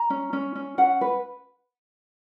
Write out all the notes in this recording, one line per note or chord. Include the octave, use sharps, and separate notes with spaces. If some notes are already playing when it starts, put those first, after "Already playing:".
Already playing: A#5
C#4
C#4
C#4
C#4 F#5
B4